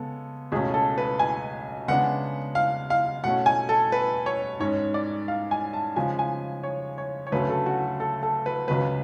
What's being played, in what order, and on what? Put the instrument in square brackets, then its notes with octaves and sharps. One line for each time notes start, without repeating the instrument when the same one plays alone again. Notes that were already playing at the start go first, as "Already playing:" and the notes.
Already playing: [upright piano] C#3 G#3 B3 [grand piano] A4
[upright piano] C#2 B2 A3 C#4 [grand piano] G#4
[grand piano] A4
B4
G#5
[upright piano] C#3 G#3 B3 D4 [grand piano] F#5
[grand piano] F5
F5
[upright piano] B2 A3 C#4 [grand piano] F#5
[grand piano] G#5
A4
B4
C#5
[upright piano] G#2 G#3 C#4 [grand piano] C#5
[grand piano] D5
F5
G#5
A5
[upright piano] C#3 F3 G#3 [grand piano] G#5
[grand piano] G#5
C#5
C#5
C#5
[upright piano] D2 C#3 F#3 A3 [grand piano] B4
[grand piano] A4
F#4
A4
A4
B4
[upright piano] C#2 C#3 F#3 [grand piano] B4